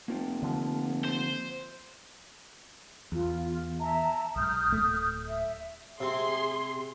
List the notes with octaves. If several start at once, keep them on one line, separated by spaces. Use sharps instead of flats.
F1 A#3 F4 G5
D3 F3
C5
E2 F4
E5 A5 A#5
B1 G#2 D#6 F6 G6
D1 A3
E5
C3 G#4 C6